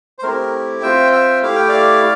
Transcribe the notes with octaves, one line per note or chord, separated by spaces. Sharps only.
C5
A3 C4 E4 G4 A#4
C4 F4 E5 G5
E5 G5
A3 E4 G4 F5
G5
D5 F5